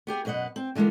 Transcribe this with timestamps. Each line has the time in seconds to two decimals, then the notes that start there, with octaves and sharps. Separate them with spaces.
0.07 B3 G4 G#4 G#5
0.25 F#2 B2 B4 D#5 F#5
0.56 C4
0.75 D3 E3 G#3 A#3 B3